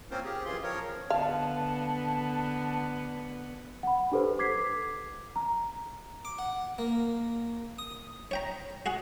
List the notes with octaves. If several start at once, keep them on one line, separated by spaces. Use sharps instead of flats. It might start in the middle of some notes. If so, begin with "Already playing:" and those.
A#3 C4 C#4 F4 A#4 C5
G4 G#4
F#2 E3 F4 G#4 C6
F3 A#4 C#5
D3 B3 F5 A5
F#5 B5
D4 G4 A4 B4 C5
D6 G#6 B6 C7
A#5
D6
F#5
A#3
D#6
C#5 G5 A#5
F#4 G#4 F#5